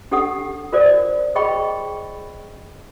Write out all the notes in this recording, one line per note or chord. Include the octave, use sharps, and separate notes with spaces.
D4 G4 A4 F#5 D#6
F4 A#4 C5 D5
G#4 D#5 G5 B5 C#6